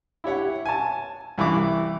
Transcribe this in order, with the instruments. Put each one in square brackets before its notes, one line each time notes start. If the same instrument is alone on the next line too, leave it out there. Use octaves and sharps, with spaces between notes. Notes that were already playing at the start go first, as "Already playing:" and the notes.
[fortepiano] E4 G4 C#5 F#5
G#5 A5
C2 E3 E4 D6